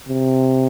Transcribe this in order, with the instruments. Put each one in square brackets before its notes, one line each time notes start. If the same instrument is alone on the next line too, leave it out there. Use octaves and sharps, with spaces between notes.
[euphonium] C3